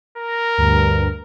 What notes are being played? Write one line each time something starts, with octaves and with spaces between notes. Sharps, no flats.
A#4 A#6
D2 G2 A#5